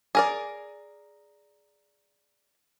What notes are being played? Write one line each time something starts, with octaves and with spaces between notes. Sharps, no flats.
G#4 A#4 D5